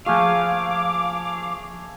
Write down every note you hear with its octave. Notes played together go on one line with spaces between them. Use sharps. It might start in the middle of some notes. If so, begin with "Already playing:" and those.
F3 A3 A#3 F4 G#4 F5 D6